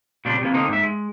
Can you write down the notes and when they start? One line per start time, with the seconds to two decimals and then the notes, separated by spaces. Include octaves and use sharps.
0.25 A#2 C#3 G3 C4 D4
0.41 C3 E3 A#3
0.54 D3 A#3 C4 D#4
0.68 G#2 E5
0.83 G#3